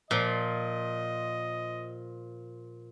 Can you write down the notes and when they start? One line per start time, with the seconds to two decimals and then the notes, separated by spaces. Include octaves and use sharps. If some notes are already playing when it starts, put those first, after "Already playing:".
0.11 A#2 F3 D#5